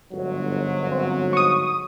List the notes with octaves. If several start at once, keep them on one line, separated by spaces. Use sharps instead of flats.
G1 G#2 F#3
C4
C#6 D#6